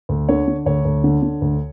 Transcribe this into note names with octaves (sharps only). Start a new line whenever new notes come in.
D2
D3 C#5
D3
D2 C#5
D2
D3
D3
D2